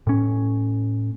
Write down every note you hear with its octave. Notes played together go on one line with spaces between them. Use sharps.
A2 C#4